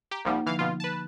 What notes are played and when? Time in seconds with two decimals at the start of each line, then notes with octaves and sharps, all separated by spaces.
0.11 G4 A#5
0.25 C2 F3 G3 A#3 D#4 F#5
0.46 D3 E3 F3 F5
0.59 B2 F4
0.80 B4 A5
0.93 F#6